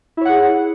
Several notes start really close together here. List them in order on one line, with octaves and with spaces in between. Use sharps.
E4 C#5 F#5 G#4